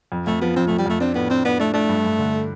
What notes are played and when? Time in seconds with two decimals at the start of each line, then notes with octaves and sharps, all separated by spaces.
0.12 F2
0.27 F2 A3
0.41 F3 B3
0.56 F2 C4
0.68 A3
0.71 F2
0.78 G3
0.86 F2 A3
1.00 C4 D4
1.15 A2 B3
1.30 C4 D4
1.45 B3 D4
1.59 A3 D4
1.74 A3 D4
1.89 G2
2.05 G2
2.19 D3